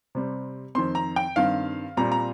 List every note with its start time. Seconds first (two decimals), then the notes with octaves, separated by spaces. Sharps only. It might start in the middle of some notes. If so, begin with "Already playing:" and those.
0.15 C3 G3 C4
0.75 F2 D#3 C4 C6
0.95 A#5
1.16 G5
1.36 G2 D#3 C4 F5
1.97 A#2 G3 C4 A#5
2.12 A#5